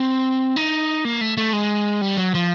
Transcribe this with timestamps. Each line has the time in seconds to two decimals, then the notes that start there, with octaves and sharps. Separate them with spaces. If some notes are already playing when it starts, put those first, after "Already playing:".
Already playing: C4
0.56 D#4
1.05 A#3
1.21 A3
1.37 A3
1.53 G#3
2.01 G3
2.17 F#3
2.35 F3